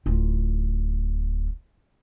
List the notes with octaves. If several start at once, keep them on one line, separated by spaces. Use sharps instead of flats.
D1 F4